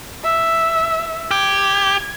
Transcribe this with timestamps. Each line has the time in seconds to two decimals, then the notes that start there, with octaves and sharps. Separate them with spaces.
0.24 E5
1.31 G4 G#6